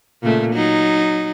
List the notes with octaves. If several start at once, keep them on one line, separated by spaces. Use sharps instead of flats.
A#2 C#3 A3
F#3 D#4